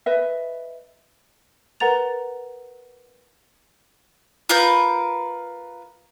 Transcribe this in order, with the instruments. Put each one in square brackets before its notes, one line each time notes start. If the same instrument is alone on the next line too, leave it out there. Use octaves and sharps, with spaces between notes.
[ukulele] B4 D#5 E5
[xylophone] A#4 B4 F#5 A#5 A6 F7
[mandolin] F4 A#4 B4 G6